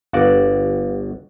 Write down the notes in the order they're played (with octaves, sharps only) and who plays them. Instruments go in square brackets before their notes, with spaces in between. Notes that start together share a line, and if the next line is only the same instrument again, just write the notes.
[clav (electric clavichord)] G1 F#4 D5 [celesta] B4 F5